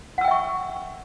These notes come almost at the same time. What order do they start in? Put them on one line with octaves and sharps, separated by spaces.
F#5 E6 G5 E5 C#6